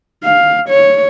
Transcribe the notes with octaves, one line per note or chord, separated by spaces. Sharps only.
F5
C#5